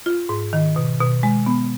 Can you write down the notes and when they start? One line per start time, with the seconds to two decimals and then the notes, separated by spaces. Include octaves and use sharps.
0.06 F4
0.29 G#2
0.53 D#3
0.76 B2
1.00 B2
1.23 G#3
1.46 B3